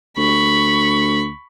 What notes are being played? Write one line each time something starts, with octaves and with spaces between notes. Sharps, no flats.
D2 B5 C#6